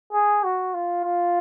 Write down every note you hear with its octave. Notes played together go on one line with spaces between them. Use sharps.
G#4
F#4
F4
F4